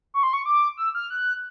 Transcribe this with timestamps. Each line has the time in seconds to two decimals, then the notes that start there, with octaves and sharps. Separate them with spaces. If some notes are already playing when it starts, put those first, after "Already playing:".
0.14 C#6
0.23 C6
0.33 C#6
0.46 D6
0.77 E6
0.95 F6
1.10 F#6